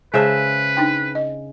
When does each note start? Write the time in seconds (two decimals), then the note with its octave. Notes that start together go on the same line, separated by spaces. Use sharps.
0.14 C#3 G#3 G#4 B4 C5 E5 A5
0.77 D4 D#4 G5
1.15 D#5